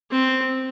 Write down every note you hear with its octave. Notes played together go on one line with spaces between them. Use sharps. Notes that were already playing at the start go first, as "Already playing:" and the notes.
C4